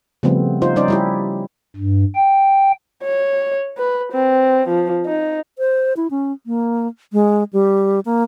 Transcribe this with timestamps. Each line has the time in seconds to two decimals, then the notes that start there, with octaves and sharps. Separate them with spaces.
0.23 C#3 F3 G3 A3 B3 C4
0.62 D#4 F4 C5
0.76 G3 C#4 D#4 C5 D5
0.88 G3 E4 G4
1.76 G2
2.15 G5
3.03 C#5
3.78 B4
4.12 C4
4.68 F3
5.06 D#4
5.59 C5
5.97 E4
6.11 C#4
6.46 A#3
7.13 G#3
7.53 G3
8.05 A#3